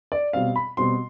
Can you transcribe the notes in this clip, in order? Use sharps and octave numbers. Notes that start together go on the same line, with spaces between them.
D5
B2 G3 C4 F5
B5
B2 G3 C4 C6